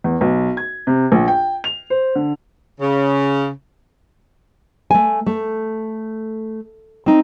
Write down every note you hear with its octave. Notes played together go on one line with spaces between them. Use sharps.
E2
B1
G#6
C3
A#1
G5
F7
C5
D3
C#3
A3 G#5
A3
C4 D#4